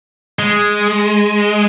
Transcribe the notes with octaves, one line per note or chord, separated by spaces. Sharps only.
G#3